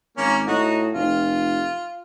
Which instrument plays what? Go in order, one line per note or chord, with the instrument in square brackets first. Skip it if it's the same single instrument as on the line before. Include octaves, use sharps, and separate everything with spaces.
[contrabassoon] G#1 [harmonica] A#3 C#4
[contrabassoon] A2 [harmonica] D#4 F#4
[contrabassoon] F1 [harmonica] F4